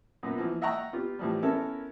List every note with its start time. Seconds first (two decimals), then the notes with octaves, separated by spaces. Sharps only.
0.23 F#2 A#2 B3
0.38 E3 F3
0.62 D#5 E5 F#5 G5 A#5 C#6
0.93 B3 F4 G4
1.19 A2 E3 F3 G3
1.42 B3 C#4 E4 A4 A#4